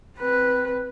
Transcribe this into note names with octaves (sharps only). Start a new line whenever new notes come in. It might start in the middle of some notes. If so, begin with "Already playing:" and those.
C4 B4